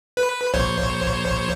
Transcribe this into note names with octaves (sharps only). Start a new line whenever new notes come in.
B4
A#1 C5 C#5